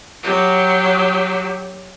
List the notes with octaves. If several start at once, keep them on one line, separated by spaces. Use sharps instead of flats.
F#3 G4